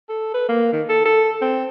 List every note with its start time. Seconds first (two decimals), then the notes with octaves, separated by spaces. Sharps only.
0.09 A4
0.34 B4
0.49 A#3
0.73 D#3
0.89 A4
1.05 A4
1.42 C4